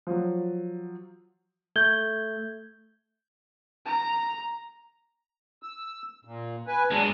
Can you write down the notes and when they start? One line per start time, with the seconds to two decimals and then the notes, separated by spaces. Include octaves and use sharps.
0.07 F3 F#3
1.76 A3 G6 G#6 G7
3.86 A#5
5.63 E6
6.25 A#2
6.67 B4 G#5
6.91 E2 F#3 G#3 D4